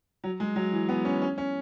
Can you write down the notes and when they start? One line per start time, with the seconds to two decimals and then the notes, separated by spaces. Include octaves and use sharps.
0.24 F#3
0.40 G#3
0.56 F#3
0.73 E3
0.89 B3
1.05 C#4
1.22 C#4
1.38 C#4